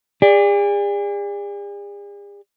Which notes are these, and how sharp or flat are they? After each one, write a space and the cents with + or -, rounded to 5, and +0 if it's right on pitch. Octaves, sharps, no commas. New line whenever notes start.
G#4 -40 D5 +0